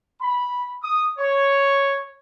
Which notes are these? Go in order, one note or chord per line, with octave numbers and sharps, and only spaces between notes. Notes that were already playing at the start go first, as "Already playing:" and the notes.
B5
D#6
C#5